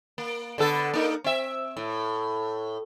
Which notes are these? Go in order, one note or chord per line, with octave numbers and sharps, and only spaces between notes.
A#3
D3 B3 A4
A#3 D#4 A#4
C4 E5
A2